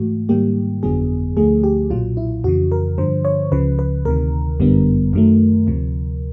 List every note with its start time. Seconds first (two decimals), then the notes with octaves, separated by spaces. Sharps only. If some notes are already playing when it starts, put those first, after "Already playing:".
Already playing: G#2 E3 A3 F#4
0.29 G#2 D#3 G3 A#3 G4
0.83 G1 F2 D3 F#3 B3 G#4
1.37 D2 D3 F3 A3 G#4
1.64 G4
1.90 B1 A#2 F#3 F4
2.17 E4
2.44 F2 C#3 E3 F#4
2.72 A#4
2.98 G2 D3 F3 C5
3.25 C#5
3.52 C#2 C#3 F3 B4
3.79 B4
4.05 D2 C3 D#3 A#4
4.60 G1 F#2 D3 G3 B3
5.13 F#2 D#3 F#3 A3
5.67 D2 C3 F3